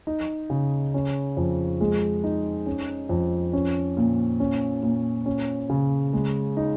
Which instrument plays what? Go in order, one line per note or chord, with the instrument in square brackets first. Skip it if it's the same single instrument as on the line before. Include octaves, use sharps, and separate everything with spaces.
[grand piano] D#4
C#3
C#4
F2
G#3
D#4
C#4
F2
C#4
A#2
C#4
A#2
C#4
C#3
G#3
D#4